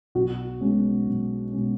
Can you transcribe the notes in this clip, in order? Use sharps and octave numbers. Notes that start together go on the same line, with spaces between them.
B1 F#4
B2 G#3 C#4
B1
B2 G#3 C#4